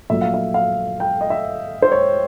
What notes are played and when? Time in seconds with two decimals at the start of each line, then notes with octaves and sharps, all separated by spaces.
0.09 A#1 A#2 F#3 A3 E5
0.22 F5
0.34 E5
0.54 F5
1.00 G5
1.21 D#5
1.30 E5
1.82 C5
1.92 C#5